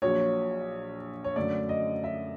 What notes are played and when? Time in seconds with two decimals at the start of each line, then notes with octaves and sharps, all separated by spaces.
0.02 A#1 A#2 F#3 C#5
1.24 C#5
1.36 F#2 D3 F#3 A3 D5
1.69 D#5
2.04 E5